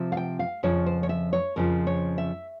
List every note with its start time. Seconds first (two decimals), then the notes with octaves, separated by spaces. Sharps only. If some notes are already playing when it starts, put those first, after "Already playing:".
Already playing: C3 F3 C4
0.12 F5
0.17 G5
0.39 F5
0.63 F2 C#3 F3 C#5
0.86 C5
1.03 C#5
1.09 E5
1.33 C#5
1.56 F2 C#3 F3 A#4
1.87 C#5
2.18 E5